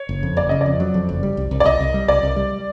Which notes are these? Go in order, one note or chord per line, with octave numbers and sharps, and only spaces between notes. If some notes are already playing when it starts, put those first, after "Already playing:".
Already playing: C#5
F#1
F2
F#1 D5
C#3 D#5
D5
F2
F#3
F2
F#1
G3
C2
C2
D5
C2 D#5
C2
G3
C2 D5
C2
G3